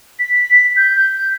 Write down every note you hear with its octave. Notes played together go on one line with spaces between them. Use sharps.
B6
G6